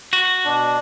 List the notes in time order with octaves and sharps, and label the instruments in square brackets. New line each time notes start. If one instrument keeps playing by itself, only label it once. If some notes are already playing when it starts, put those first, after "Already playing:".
[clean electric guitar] F#4
[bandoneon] B2 D4